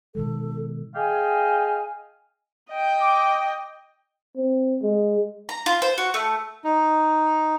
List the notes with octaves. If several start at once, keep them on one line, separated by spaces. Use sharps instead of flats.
B2 D#3 G#3 A4
G#4 D#5 F5 G5 G#5
D#5 G5
D6
C4
G#3
A#5
F4
C5
F#4
A3
D#4